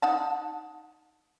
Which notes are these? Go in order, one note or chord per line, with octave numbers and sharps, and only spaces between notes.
D#4 F#5 A5